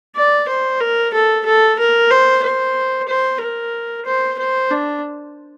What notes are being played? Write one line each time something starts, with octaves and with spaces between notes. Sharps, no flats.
D5
C5
A#4
A4
A4
A#4
C5
C5
C5
A#4
C5
C5
D4